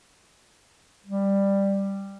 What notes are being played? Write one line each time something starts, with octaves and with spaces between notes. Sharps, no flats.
G3